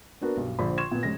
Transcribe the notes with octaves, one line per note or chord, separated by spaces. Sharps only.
A#3 B3 D4 F#4 A#4 B4
B1 G2
A#1 D3 C5 D5 B5
C6 C#6 G#6 E7
A#2 B3
F1 G#3 C#4 A#6